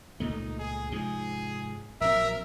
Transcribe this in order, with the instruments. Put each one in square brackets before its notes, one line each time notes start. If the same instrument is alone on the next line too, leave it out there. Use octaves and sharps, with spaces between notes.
[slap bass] C#2 A#2 A3 [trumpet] D#4
[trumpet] G#4
[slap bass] G#2 C3 F3 [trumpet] G#4
[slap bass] A#1 F#3 C4 [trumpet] A#4 [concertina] E5